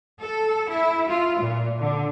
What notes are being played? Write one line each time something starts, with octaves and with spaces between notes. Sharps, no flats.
A4
E4
F4
A#2
D3